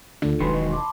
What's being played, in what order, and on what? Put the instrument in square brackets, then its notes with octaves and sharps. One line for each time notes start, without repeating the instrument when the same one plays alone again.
[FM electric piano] D2 A3 D4 [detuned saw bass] D3 [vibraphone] F4 A4
[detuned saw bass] F1 [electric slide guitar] D#3 F#3 G#3 [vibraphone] B4 [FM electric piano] B5 C6
[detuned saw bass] E1 [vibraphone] D#5 C#6
[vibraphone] A5 D6